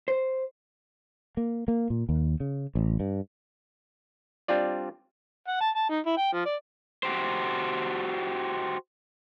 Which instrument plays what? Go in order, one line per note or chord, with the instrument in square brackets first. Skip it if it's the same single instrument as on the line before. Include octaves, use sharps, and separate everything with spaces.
[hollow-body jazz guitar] C5
[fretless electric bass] A#3
A#3
A#2
D#2
C#3
A1
G2
[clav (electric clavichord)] G3 C4 D4 F4 D5
[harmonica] F#5
A5
A5
D#4
E4
G5
F3
D5
[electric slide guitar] F#4 G4 C5